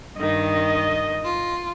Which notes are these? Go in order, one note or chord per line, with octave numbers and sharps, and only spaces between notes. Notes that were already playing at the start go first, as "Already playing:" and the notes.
G2 D#3 D#5
F4